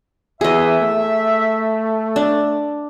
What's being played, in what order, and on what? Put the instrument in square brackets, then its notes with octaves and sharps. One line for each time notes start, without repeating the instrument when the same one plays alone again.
[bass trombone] E2 [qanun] G#4 D#5 [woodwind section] E5
[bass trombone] A3
[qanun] D4